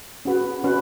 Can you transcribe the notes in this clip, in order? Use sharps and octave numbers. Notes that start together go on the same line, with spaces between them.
C#4 F#4 B4
C#4 F#4 B4